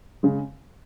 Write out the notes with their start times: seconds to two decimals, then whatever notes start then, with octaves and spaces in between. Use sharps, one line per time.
0.23 C#3 G#3